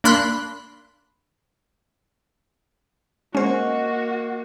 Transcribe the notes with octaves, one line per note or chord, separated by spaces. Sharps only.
A#3 D4 B5 C6 F#6
G#3 A#3 C#4 F#4 C5 D#5